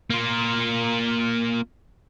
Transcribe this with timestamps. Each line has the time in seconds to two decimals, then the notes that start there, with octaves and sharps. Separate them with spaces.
0.10 A#3 F4